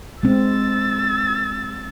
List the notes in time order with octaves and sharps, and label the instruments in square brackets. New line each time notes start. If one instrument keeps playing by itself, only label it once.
[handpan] G#3 C4 [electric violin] E6 A6